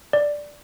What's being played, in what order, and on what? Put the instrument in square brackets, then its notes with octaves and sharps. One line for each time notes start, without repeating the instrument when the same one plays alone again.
[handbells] D5